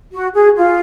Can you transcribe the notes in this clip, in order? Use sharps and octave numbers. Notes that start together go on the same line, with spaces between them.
F#4
G#4
F4